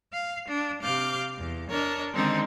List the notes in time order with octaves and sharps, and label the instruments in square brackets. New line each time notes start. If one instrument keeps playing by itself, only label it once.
[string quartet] F5
D4
C3 F5 D6 F6 G6
E2
D4 A#4 C#5 D#5
D3 D#3 G#3 C4 C#4 D#4